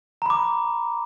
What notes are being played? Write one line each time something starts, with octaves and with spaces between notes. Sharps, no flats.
A#5 B5 D6